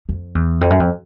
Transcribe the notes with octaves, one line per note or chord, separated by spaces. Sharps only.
F2
E2
F2
F#2
F2